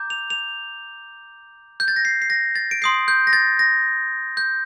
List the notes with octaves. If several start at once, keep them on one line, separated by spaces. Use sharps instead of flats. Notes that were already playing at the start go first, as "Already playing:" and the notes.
Already playing: A#5 D6 G6
F7
F7
G6
A6
A#6
C7
C7
A#6
A6
D7
C6 D#6 G6 C7
G6
A#6
A6
A#6
G6